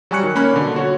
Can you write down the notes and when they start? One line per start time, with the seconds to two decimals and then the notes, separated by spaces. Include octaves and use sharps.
0.11 F#3 G3 G#5 C#6 F#6 C#7
0.23 D#3
0.35 A#3 C#4 B5 F#6
0.53 B2 D3
0.76 F#4 C#5